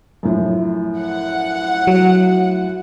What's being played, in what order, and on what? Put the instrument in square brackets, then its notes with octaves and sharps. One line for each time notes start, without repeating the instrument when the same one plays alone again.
[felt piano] F#2 A2 F3
[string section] F#5
[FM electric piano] F#3